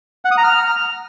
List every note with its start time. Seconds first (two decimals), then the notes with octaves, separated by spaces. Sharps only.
0.25 F#5
0.31 D#6
0.37 A#5
0.44 F6